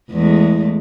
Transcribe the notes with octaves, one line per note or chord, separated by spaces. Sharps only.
E2 G#3 A3